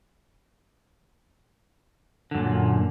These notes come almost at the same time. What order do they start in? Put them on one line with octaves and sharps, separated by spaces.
D3 F#2 A#2